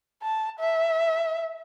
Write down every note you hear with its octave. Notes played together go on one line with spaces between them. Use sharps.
A5
E5